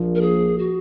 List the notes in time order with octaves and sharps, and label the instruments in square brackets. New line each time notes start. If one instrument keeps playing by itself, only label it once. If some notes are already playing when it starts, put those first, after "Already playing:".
Already playing: [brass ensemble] A#1 A#2 F3
[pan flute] A#4
G#4
F#4